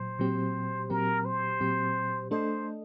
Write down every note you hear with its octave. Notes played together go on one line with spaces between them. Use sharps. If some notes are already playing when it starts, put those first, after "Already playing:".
Already playing: A#2 F#3 C5
A#2 F#3 C4 G4
A#2 F#3 C4 G4 A#4
C5
A#2 F#3 C4 G4
A3 D4 A4 C5 D#5